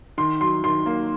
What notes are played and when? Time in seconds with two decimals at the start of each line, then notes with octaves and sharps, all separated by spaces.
0.18 D#3 C6
0.40 F#3 C6
0.64 D#3 C6
0.86 A#3